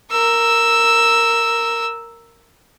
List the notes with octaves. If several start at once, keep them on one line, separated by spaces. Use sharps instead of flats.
A#4 E6